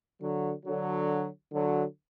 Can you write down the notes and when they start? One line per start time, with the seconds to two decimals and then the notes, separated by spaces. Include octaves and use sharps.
0.20 D3 F#3
0.65 D3 F#3
1.52 D3 F#3